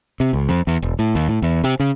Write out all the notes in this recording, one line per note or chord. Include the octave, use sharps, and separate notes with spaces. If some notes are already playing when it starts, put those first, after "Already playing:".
C3
C#2
F2
E2
E1
A2
D#2
A2
E2
C3
C#3